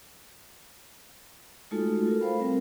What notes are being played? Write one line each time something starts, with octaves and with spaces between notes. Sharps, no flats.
G#3 A3 D#4 F4 F#4 A4
F4 A4 A#4
C5 F5 G5 B5
G3 C4 A#4